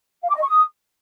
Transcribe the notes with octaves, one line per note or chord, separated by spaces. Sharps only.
F5
D6
D#5
C#6
D#6